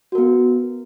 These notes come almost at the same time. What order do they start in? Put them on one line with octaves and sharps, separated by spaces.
F#4 A#4 B3